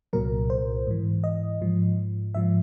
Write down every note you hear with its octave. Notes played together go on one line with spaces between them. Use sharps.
C2 A#2 F#3 A#4
C5
G#2 E3
D#5
G#2 F3
G#2 F3 E5